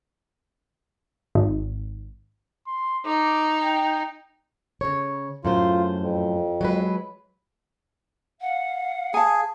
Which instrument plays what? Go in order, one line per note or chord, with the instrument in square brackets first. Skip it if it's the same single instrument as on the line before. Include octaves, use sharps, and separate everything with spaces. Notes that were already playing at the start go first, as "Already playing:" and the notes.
[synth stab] G#1
[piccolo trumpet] C6
[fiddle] D#4 [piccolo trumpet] D6
[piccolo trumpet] G5
[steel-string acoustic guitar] C#3 C#5
[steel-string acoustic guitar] F#2 A2 C5 [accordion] F4
[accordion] F2
[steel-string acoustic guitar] F#3 G#3 B4
[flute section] F5 [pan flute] F#5
[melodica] G#4 [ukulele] G#5 A5